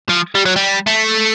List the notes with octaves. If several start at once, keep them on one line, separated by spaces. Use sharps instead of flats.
F3
G3
F#3
G3
A3